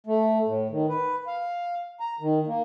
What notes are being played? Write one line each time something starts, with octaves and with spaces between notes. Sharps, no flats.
A3
A2
D#3
B4
F5
A#5
D#3
A#3